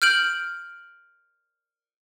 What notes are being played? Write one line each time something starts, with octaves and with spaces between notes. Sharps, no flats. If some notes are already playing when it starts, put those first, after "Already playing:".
F6 G6 D7 F#7